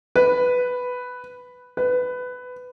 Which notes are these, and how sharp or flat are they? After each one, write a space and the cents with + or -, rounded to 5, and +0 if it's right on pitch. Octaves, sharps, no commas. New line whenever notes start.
B4 +5
B4 +15